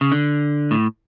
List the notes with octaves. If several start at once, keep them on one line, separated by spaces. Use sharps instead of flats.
C#3
D3
A2